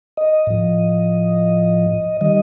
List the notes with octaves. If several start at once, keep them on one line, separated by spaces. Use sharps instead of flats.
D#5
A2 F3
D#3 G3 D#5